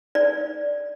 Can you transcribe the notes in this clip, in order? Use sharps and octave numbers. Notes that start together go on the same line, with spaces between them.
D5